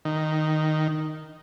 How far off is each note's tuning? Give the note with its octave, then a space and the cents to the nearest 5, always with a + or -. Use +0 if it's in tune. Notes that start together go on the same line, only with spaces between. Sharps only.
D#3 -5